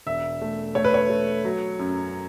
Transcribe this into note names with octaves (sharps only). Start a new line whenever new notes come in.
E1 E5
A3
A3 C#5
B4
C#5
A3
F#3
F#2